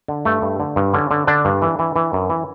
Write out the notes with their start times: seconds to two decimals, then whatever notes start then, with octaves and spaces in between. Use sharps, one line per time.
0.08 D3
0.25 G2 A3
0.42 G2
0.60 D3
0.76 G2
0.93 D3 C#4
1.11 D3
1.27 D3 D4
1.45 G2
1.62 E3
1.79 E3
1.96 E3
2.13 F#2
2.30 E3